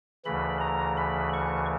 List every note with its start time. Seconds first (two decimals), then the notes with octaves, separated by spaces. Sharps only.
0.25 D2 C#3 E3 B5
0.60 A#5
0.97 B5
1.33 C#6